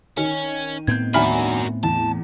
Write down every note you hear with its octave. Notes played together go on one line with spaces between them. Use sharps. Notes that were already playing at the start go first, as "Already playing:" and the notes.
D#3 C#4
A2 B3 C4 G6 G#6
D#2 D4 F#4 A#4 E5 G#5 B5 F6
E2 A5